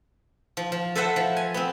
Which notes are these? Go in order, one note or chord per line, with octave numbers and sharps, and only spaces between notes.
F3
F3
A4 B4 C5 E5 F#5
F3
G#5
B3 C4